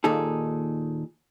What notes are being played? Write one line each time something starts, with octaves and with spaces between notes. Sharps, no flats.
D#2 A#2 D#4 G#4 A4